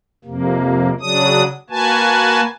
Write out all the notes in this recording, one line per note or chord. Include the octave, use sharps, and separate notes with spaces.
F2 C3 A#3
C#3 F#3 D4 D#6
A#3 F#4 B4 G#5 A5